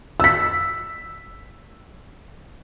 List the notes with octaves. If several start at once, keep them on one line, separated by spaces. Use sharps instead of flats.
E6 B6